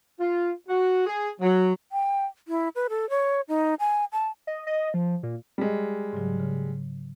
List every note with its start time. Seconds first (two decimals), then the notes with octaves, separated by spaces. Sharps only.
0.20 F4
0.69 F#4
1.07 G#4
1.41 F#3
1.92 G5
2.48 E4
2.75 B4
2.89 A4
3.10 C#5
3.48 D#4
3.80 G#5
4.12 A5
4.47 D#5
4.67 D#5
4.94 F3
5.23 A#2
5.58 G3 G#3
6.12 G#2 C#3 F#3
6.40 C#3